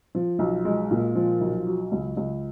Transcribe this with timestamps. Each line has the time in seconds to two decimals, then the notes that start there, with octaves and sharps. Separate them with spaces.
0.15 F3
0.39 B1
0.65 G#3
0.91 A#2
1.15 F3
1.41 B1
1.67 F#3
1.92 C#2
2.17 C#2